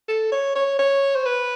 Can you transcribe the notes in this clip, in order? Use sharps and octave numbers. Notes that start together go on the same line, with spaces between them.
A4
C#5
C#5
C#5
C5
B4